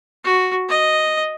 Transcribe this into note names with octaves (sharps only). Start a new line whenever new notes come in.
F#4
D#5